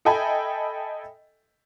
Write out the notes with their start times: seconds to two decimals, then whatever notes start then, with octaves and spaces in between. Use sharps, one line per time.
0.05 A4 D#5 E5 G5 G#5 B5